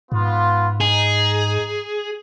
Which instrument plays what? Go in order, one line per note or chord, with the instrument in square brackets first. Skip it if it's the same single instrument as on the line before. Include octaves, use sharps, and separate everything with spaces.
[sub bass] G#2 [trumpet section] B3 F4
[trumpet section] D#4 [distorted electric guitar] G#4